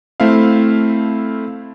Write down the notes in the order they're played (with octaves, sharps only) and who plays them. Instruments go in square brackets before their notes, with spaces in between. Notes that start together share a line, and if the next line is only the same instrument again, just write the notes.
[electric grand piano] A3 C4 E4 E5 F5